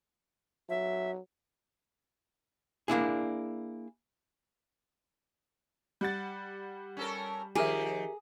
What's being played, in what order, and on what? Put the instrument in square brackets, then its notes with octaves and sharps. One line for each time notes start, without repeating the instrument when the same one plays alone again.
[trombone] F#3 [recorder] E5
[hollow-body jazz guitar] A#3 D4 E4 G#4
[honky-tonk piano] G3 F#5 A6
[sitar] C#4 A4 A#4
[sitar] D#3 F3 [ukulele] G4 A#4 E5 [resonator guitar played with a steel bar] G#4